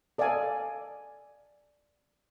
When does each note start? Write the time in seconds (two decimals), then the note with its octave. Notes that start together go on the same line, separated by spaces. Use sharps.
0.18 A4 D5 D#5 F5 G#5